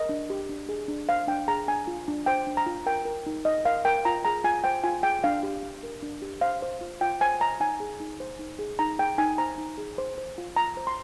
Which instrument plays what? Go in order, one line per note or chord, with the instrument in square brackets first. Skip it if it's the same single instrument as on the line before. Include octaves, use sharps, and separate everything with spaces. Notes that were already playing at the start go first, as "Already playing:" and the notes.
Already playing: [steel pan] A#4 D#5
D4
G4
D4
G#4
D4
C5 F5
D4 G5
G#4 A#5
D4 G#5
F4
D4
C5 G5
D4
A#5
F4
A#4 G5
A#4
D#4
D#4 D#5
A#4 F5
A#4 G5
F4 A#5
G#4 A#5
F4 G#5
C5 G5
F4 G#5
G#4 G5
D4 F5
G4
D4
A#4
D4
G4
C5 F5
C5
F4
F4 G5
C5 G#5
C5 A#5
D#4 G#5
G#4
D#4
C5
D#4
G#4
D#4 A#5
G#4 G5
D#4 G#5
C5 A#5
D#4
G#4
C5
C5
F4
F4 A#5
C5
C6